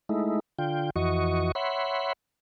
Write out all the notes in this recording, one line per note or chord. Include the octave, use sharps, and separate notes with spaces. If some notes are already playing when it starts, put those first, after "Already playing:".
G#3 A3 D#4 E4
D3 F4 G5
F2 E3 F#4 D#5 C#6
C#5 E5 F#5 B5 C6